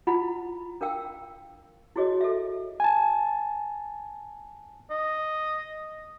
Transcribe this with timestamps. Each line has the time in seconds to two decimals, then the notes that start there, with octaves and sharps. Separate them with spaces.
0.07 E4 F4 F#5 A#5 B5
0.81 D4 A#4 F5 G5 E6
1.96 E4 F#4 G#4 C#5 D#5
2.21 A4 E5
2.80 G#5 A5
4.91 D#5